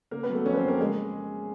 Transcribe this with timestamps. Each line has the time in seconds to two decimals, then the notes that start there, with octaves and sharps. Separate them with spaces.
0.11 C#3 A#3 A#4
0.23 B3 B4
0.30 F#3 A3 A4
0.45 F2 C#4 C#5
0.53 B4
0.57 C4 C5
0.64 F2 A#3 A#4
0.79 C#3 G#3 G#4